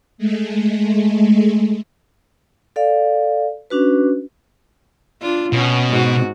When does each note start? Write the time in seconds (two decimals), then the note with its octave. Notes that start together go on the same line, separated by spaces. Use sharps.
0.18 G#3 A3
2.76 A4 D5 F5
3.70 C#4 D4 F#4 B4
5.22 D4 F4
5.53 B2 B3 C#4
5.90 G#2 F#4